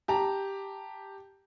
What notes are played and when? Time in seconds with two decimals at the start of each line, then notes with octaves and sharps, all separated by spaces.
0.08 G4 A5 A#5